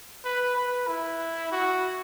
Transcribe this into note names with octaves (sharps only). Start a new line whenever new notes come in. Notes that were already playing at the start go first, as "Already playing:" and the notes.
B4
B4
E4
F#4